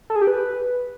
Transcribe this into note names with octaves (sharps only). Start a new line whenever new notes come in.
A4
G#4
G4
B4